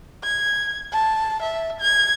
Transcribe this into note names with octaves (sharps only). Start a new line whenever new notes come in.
G#6
A5
E5
G#6